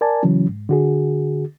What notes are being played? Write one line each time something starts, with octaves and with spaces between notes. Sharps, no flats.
A#4 D5 G#5 A5
C#3 E3 F#3 C#4
G#2
D3 F#4 G#4